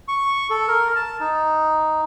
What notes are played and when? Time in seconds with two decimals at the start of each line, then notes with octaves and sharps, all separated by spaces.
0.08 C#6
0.50 A4
0.68 A#4
0.95 A5
1.20 D#4